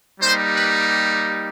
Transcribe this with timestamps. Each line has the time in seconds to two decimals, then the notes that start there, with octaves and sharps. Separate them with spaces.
0.20 G3 A#3 D#4 G4 C5
0.56 B4